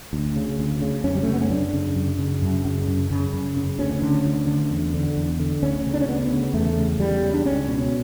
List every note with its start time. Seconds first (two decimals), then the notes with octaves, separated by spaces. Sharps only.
0.13 D2
0.36 C#3
0.59 D2
0.82 C#3
1.04 F#2 C#4
1.15 G3
1.23 A3
1.27 C#3
1.33 B3
1.41 C#4
1.50 F#2 D4
1.73 C#3
1.96 F#2
2.19 C#3
2.42 F#2
2.65 C#3
2.88 F#2
3.10 C#3
3.33 F#2
3.57 C#3
3.79 D2 C#4
4.02 D3
4.25 D2
4.47 D3
4.71 E2
4.94 D3
5.17 E2
5.39 D3
5.63 D2 C#4
5.86 C#3
5.94 D4
6.01 C#4
6.08 D2 B3
6.31 C#3
6.53 E2 A3
6.77 C#3
6.99 E2 G3
7.23 C#3
7.34 D4
7.45 C#2 C#4
7.68 B2